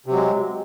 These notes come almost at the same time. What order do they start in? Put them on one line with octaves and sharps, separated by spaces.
C3 F#3 G#3